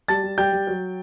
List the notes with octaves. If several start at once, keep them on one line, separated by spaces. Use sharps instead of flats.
G3 A5 A6
G3
G3 G5 G6
G3
F#3